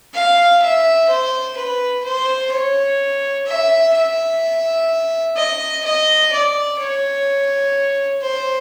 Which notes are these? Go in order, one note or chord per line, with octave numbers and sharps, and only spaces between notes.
F5
E5
C5
B4
C5
C#5
E5
E5
D#5
D#5
D5
C#5
C5